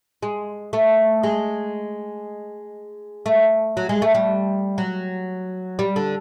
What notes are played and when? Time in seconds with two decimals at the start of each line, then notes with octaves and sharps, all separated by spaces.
0.23 G#3
0.73 A3
1.23 G#3
3.26 A3
3.77 F#3
3.89 G#3
4.02 A3
4.14 G3
4.78 F#3
5.79 G3
5.96 D3